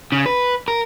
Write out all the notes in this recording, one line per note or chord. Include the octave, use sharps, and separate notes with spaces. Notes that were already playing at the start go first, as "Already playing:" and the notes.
C#3
B4
A#4